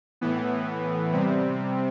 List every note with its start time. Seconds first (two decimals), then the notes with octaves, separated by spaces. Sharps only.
0.21 A2 E3 B3
1.12 C3 G3 C4